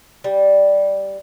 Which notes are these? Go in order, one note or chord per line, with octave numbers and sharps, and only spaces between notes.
G3